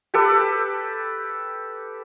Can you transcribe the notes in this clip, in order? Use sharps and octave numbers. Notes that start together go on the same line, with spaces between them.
G4 A4 B4